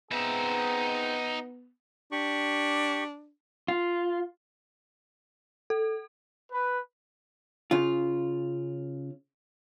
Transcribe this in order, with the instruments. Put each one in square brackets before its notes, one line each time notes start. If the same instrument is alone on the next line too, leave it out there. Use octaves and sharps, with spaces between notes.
[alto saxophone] B3 [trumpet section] C4 G#4 A#5 [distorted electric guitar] D#4 E5
[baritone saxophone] D4 [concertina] G4 C#6
[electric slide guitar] F4
[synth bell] A4
[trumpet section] B4
[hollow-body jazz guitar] C#3 F4